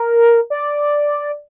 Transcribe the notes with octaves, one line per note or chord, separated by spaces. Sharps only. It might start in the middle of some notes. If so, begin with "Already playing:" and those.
Already playing: A#4
D5